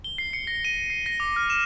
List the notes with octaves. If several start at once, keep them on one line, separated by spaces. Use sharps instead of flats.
G7
C7
C#7
A#6
D#7
C7
A#6
D6
F6
E7